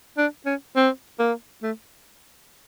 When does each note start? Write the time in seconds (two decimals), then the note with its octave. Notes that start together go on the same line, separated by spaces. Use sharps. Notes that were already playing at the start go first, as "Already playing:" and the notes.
0.17 D4
0.46 C#4
0.76 C4
1.19 A#3
1.62 A3